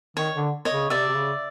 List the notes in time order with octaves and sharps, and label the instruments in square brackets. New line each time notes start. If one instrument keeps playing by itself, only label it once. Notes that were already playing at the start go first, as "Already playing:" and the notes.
[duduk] D#3 [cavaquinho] C#5
[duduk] D3
[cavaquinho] C#5 D#5
[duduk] C#3
[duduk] C3 [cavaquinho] D5 E5
[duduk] C3
C#3